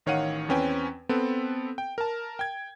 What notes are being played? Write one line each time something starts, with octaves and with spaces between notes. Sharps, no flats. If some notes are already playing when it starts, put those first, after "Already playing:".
A1 D#3 C#5 F5 F#5 D#7
E2 C4 C#4 B4 G5 G#5
B3 C4 A4 B4
G5
A#4 A5
G5 G#6